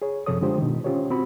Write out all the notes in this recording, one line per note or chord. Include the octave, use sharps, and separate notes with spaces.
G#4 C#5
F#2 C3 F3 A4 C#5 D#6
D3 G#3 D4 F4 G4 C5
B2 D#3
C#4 F4 G4 C5 C#5
C4 F#4 B5